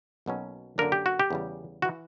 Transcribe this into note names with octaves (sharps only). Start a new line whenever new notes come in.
B1 B2 F#3 A#3 C#4
F#2 D3 A#3 D4 A#4
G4
F#4
G4
E2 C#3 G3
F#4
E3